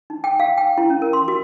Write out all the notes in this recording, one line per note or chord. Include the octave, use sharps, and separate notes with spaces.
D#4
G5
F5
G5
E4
C#4
A#4
C6
F#4